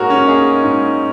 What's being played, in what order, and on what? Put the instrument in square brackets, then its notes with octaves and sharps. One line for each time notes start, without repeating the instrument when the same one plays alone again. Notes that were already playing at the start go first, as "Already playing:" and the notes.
Already playing: [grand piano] G#2 A#3 F#4 G#4 A#4 C#5
C#4 F#4
A#3 D#4 G#4
G#2